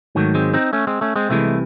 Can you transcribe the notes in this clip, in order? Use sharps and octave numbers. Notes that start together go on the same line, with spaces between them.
G#2 D#3 F#3 A3
G#3 C4
C4 D#4
A3 C#4
G#3 C4
A3 C#4
G#3 C4
C2 C3 E3 G#3 A3